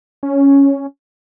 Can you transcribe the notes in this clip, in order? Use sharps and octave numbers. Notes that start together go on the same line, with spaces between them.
C#4